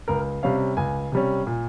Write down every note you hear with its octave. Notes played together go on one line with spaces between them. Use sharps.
C#2 A#4
C3 G3 C#4 F5
C#2 G#5
C3 G3 C#4
A#2